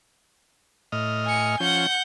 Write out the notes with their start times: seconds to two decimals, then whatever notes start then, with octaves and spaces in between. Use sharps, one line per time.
0.92 A2 D#5 F6
1.26 G#5 C#7
1.60 F3 C#4 F#5 G6